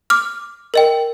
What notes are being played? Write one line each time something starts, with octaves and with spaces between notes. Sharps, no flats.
D6 F6
A#4 D#5 G5